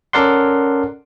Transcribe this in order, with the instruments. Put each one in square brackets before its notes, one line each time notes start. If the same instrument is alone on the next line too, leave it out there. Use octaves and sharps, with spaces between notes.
[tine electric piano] C#4 A4 A#4 D5 F#5 C6